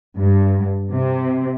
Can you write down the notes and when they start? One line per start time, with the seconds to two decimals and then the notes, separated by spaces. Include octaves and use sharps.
0.16 G2
0.91 C3